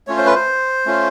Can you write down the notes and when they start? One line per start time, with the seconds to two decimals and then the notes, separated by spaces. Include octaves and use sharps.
0.07 A3 C#4 F4 C#5
0.17 C5
0.26 B4
0.34 C5
0.86 A3 C#4 F4